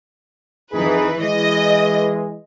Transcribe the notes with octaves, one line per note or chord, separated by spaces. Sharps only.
F2 E3 D#4 G#4 B4
E3 G#3 D#5